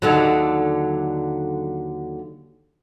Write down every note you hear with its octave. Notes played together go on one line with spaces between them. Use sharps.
D#2 D3 F#3